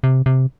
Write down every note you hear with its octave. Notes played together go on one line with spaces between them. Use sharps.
C3
C3